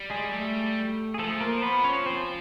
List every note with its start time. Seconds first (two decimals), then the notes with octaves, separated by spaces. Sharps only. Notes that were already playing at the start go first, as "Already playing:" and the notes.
Already playing: G3
0.10 G#3 G#4
0.32 A3 A4
1.14 G#4
1.19 F3 A3 A4
1.40 A#3 A#4
1.58 C5
1.62 B3 B4
1.84 C#4 C#5
2.06 C4 C5